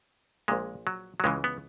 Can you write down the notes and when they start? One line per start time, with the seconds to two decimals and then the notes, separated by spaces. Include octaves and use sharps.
0.48 A#1 A#2 G#3
0.87 F#3
1.20 F#3
1.24 C#2 C#3 E3 G#3
1.44 B3